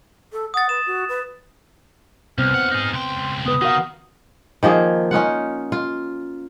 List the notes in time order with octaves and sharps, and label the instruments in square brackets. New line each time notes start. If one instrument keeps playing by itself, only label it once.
[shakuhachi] A4
[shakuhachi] F#5 [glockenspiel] D#6 A6
[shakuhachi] B4 [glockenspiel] E7
[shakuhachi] F#4
B4
[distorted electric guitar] C2 [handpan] B3 C4 [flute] F6
[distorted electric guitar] D#2 F#5
D#4 G#4
[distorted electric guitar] C#2 G5 [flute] C6
[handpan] B3 B4 [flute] D#6
[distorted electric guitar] D#3 [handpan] F#4 A#4 F5
[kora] D#3 F3 A#3 G#4
C#4 D#4 F4 F#5
F4